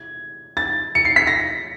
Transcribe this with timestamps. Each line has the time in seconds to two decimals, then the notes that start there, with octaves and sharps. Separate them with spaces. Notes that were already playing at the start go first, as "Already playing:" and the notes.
Already playing: G#6
0.57 A6
0.95 C#7
1.05 C7
1.16 B6
1.27 A#6